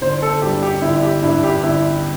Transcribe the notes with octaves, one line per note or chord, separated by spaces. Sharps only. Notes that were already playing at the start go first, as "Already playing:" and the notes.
G1 C5
A4
G2 G3 G4
G4
G1 E4
G4
G2 G3 E4
G4
G1 E4